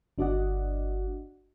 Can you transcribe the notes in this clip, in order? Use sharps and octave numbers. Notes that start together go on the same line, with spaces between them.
G1 D4 F#4 D5 D#5 F#5